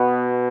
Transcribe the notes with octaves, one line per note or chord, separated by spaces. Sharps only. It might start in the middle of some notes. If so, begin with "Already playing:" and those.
Already playing: B2 B3